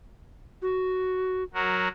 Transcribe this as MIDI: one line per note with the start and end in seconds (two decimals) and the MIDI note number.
0.62 1.43 66
1.54 1.88 54
1.54 1.88 66
1.54 1.88 70